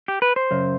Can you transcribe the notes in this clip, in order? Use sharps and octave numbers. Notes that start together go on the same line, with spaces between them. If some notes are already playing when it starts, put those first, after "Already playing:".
G4
B4
C5
F#2 C#3